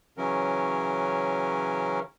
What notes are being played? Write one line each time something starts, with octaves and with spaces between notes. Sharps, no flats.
C#3 E3 F#3 C#4 A#4